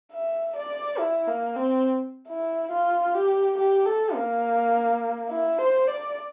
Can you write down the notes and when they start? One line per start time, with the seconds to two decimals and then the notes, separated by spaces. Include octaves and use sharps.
0.13 E5
0.56 D5
0.99 E4
1.28 A#3
1.56 C4
2.28 E4
2.71 F4
3.15 G4
3.58 G4
3.86 A4
4.15 A#3
5.29 E4
5.58 C5
5.87 D5